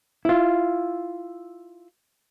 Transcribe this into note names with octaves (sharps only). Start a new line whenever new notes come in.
E4 F4